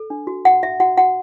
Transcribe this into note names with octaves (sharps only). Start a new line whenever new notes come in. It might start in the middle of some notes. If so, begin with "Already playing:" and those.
Already playing: A4
D4
F#4
F#4 F#5
F#4 E5
F#4 F#5
F#4 F#5